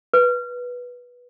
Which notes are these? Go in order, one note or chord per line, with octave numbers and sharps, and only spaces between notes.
B4